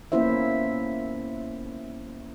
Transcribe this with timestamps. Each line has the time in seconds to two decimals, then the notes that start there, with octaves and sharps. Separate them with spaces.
0.12 A#3 B3 C#4 E4 C5 E5